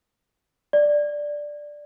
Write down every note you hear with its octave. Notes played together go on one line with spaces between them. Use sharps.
D5